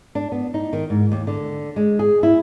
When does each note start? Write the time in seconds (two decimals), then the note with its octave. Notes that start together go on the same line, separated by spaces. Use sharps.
0.15 D4
0.32 B3
0.54 D#4
0.73 D#3
0.90 G#2
1.12 D#2
1.27 D3
1.76 G#3
1.99 G#4
2.23 E4